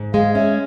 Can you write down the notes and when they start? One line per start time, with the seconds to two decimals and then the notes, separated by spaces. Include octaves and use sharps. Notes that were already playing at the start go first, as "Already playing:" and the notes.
Already playing: G#2
0.13 G#3 F5
0.34 C#4 E5